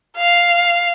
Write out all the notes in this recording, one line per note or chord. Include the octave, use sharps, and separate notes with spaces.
F5